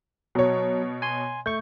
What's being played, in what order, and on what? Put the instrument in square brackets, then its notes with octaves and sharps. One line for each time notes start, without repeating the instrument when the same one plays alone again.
[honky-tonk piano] B2 C#5 [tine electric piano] F#3
[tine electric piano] G#5 C6
[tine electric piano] A3 C#6 [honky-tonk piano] G6